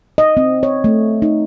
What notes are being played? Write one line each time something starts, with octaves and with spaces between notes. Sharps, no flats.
D#5
C4
C#5
A3
D#4